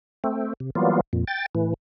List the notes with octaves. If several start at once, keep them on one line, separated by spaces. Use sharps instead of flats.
A3 C4
C3
E3 F#3 G3 A#3 B3 F4
F2 A#2
G5 A6
A2 E3